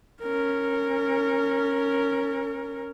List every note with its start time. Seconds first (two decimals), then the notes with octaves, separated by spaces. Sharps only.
0.23 C#4 A#4